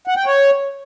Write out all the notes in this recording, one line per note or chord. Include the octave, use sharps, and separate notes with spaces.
F#5
G5
C#5